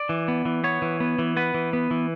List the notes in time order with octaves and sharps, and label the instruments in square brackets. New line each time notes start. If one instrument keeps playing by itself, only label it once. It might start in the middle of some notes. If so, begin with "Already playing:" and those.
Already playing: [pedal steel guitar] D5
E3
B3
E3
B3 C#5
E3
B3
E3
B3 B4
E3
B3
E3